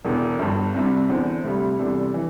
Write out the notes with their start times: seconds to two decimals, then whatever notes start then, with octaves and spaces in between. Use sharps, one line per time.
0.05 E1 E2 D3
0.39 G1 G2 D3
0.74 C2 C3 G3 D4
1.09 E2 D3 C4
1.44 D2 C3 G3
1.79 E2 C3 G3 D4 A4
2.14 E3